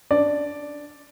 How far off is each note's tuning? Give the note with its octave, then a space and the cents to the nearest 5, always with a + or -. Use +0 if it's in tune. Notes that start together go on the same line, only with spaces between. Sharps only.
D4 +0 D5 +0